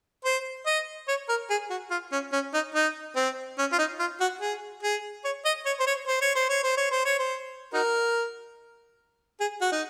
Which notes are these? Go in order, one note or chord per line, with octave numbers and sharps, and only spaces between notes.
C5
D#5
C#5
A#4
G#4
F#4
F4
C#4
C#4
D#4
D#4
C4
C#4
F4
D#4
F4
F#4
G#4
G#4
C#5
D#5
C#5
C5
C#5
C5
C#5
C5
C#5
C5
C#5
C5
C#5
C5
D#4 F#4 A#4
G#4
F#4
D#4